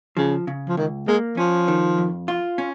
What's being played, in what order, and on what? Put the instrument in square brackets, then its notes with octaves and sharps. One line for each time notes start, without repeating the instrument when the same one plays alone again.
[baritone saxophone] C#3 [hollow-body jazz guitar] F3
[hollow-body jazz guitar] C#3
[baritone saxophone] F3
[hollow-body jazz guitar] C#2 [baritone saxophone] D#3
[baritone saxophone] G#3 [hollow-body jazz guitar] A#3
[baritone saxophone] F3 [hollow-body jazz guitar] C#4
[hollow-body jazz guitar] D#3
F2
F4
C#4